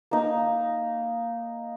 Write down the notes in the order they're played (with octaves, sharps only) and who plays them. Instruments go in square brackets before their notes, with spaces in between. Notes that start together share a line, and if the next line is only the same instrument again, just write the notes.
[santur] A#3 D#4